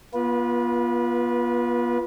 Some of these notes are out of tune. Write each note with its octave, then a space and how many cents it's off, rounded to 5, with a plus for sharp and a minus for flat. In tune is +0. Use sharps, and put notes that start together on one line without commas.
B3 -40 F4 +0 B4 -25